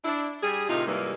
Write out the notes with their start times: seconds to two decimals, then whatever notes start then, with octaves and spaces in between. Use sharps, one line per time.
0.05 D4 E4
0.43 G3 G#4
0.69 A2 C3 D#3 D#4 F4
0.87 G#2 C3 D#3 E3 G3 A#3